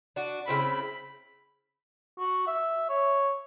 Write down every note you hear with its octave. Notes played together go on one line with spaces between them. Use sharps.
D4 F#4
C#3 C4 E4 B5
F#4
E5
C#5